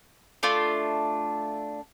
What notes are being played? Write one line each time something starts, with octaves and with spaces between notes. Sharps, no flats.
A3 D4 F4